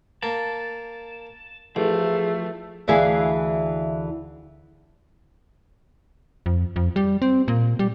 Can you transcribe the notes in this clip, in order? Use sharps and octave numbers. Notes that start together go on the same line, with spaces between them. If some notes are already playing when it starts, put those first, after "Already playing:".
A#3 A5
A1 F3 A3 G#4
D2 E3 E4 G#4 F5
F2
F2
G3
C4
A#2
G3